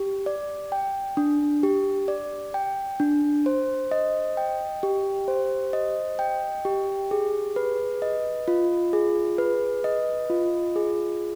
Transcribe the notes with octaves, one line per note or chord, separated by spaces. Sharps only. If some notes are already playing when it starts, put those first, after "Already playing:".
Already playing: G4
D5
G5
D4
G4
D5
G5
D4
C5
D#5
G5
G4
C5
D#5
G5
G4
G#4
B4
D#5
F4
G#4
B4
D#5
F4
G#4